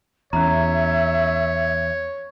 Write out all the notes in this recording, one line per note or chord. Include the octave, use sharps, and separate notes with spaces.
E2 C#4 C#5 E5 A#5